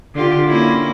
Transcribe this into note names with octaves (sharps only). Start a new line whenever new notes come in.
D3 F4 G4
A#3 C#4 E4